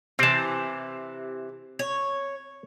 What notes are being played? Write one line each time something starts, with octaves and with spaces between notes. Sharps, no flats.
C3 E3 C4 A5
C#5